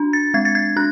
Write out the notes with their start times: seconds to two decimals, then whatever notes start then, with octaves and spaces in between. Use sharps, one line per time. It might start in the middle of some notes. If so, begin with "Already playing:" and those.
Already playing: D4
0.13 A6
0.34 G#3 G#6
0.45 A6
0.55 G#6
0.76 D4 F#6